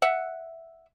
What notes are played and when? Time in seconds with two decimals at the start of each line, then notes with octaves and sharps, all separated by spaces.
0.02 E5 F#5